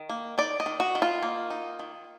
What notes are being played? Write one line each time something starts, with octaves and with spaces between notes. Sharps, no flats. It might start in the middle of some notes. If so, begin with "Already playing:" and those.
Already playing: D#3
A#3
D#4 D5
D#5
D#3
F#4
D#3
F4
A#3
D#4
D#3